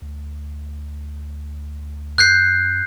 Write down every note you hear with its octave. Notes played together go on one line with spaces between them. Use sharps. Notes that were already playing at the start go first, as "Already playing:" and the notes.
D2
F#2 F#6 G6 C7